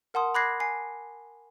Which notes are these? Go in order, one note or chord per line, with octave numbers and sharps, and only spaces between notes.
A#4 F#5 A5 C6 D#6
B5 D6 F#6 G#6 A#6 C7
G#5 C7